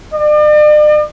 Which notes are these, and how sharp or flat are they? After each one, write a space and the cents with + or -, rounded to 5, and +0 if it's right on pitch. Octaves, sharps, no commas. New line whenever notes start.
D5 +40